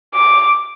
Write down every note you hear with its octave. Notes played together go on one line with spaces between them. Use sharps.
D6